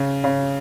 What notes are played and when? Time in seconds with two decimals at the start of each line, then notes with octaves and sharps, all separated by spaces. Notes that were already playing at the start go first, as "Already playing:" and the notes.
Already playing: C#3
0.24 C#3